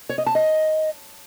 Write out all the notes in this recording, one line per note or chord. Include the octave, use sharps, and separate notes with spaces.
C#5
D#5
A5
D#5